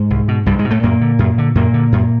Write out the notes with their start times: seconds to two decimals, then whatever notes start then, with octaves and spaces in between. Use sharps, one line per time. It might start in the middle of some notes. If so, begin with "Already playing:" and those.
Already playing: G#2 G#3
0.10 C2
0.28 B2
0.46 C2 G2 G3
0.59 G#2 G#3
0.64 B2
0.71 A2 A3
0.83 F#2 A#2 A#3
1.01 D3
1.19 F#2
1.38 D3
1.55 F#2 A#2 A#3
1.74 D3
1.92 F#2